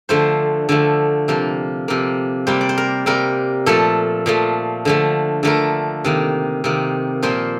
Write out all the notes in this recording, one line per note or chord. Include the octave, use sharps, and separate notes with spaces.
D3 F3 A3 C5
D3 F3 A3
C3 F3 A#3
C3 F3 A#3
C3 G3 A#3 C5
D5
C5
A#4
C3 G3 A#3 A#4
A#2 F3 A3 A4
A#2 F3 A3
D3 F3 A3
D3 F3 A3 A#4
C3 D#3 A#3
C3 D#3 A#3
A#2 F3 A#3 C5